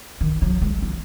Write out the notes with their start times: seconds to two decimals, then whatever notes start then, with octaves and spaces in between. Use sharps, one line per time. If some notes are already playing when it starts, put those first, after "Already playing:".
0.21 D#3
0.42 F#3
0.62 G#3
0.83 D#3